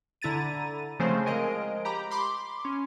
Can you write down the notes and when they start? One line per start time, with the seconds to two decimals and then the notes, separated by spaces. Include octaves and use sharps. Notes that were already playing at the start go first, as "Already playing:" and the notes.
0.22 D3 E4 A#5 A6 D#7
0.99 C#3 F3 G#3 A3 C4 C5
1.26 F3 G#3 A#4 D#5 D7
1.85 G4 A#5 B5 D6
2.11 B5 C6 D6
2.65 C#4